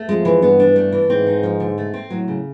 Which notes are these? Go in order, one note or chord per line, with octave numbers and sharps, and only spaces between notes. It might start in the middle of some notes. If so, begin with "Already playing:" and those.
Already playing: A3
F2 G#3
E3
G2 B3
D4
A3
E3
G#2 C4
D#4
F3
D3
A3
C4
A2 F#3
C#3